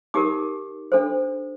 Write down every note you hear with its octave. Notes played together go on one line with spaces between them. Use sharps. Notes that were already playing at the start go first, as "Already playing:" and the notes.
D#4 G4 A#4 D6
D4 A4 C5